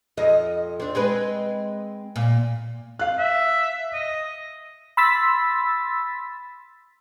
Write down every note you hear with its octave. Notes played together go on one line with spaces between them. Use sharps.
F2 D#5
C4 D4
G#3 C4 B4
A#2
F5 F#6
E5
D#5
B5 C6 E6 A6 B6